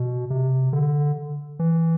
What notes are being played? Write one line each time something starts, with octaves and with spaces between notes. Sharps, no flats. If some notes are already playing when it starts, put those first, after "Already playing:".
Already playing: B2
C3
D3
E3